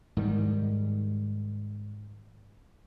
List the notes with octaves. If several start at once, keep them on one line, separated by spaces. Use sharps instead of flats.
G#2 D#3 G3